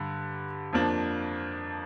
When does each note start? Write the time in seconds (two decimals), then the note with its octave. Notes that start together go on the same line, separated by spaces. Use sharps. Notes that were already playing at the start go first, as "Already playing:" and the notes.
Already playing: G2 D3
0.73 F2 F3 A#3 D4